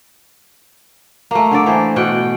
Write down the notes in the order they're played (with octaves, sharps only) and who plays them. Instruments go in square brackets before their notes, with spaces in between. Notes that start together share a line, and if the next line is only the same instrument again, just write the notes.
[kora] A3 A#3
D3 A4 D5
E3 C5
B2 F#5 G5